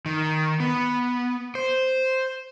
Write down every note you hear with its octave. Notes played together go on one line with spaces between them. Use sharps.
D#3
B3
C5